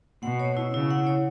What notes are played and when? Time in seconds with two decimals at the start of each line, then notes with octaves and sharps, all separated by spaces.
0.23 B2 F#5
0.40 C#5
0.57 E4
0.73 C#3 E4
0.90 F#5
1.07 C#5